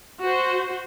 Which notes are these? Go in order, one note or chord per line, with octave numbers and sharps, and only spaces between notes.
F#4 C5